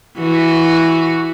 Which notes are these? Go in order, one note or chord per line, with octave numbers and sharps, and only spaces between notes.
E3 F#4